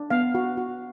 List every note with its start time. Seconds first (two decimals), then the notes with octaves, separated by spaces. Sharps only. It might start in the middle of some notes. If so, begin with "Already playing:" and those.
Already playing: D4
0.10 B3 F5
0.35 F#4
0.57 F#4